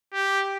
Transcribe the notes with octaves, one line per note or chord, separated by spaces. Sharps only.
G4